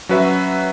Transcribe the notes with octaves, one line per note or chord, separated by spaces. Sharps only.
F#3 C#4 F#4 B4 E5